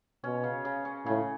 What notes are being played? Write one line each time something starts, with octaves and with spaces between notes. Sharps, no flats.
B2 C#4
C#3
C#3
C#4
A2 C#3